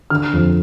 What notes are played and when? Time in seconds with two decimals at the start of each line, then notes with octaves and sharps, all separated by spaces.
0.10 D3 F6
0.33 F2